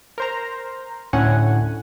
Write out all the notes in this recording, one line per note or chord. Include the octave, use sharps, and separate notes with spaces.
A#4 C5 A#5
D2 A2 C#4 F#5 G#5